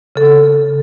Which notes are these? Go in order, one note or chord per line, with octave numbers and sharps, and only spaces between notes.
C#3 A4